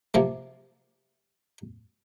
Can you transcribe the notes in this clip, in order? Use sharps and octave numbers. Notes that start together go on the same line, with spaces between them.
C3 F3 A#3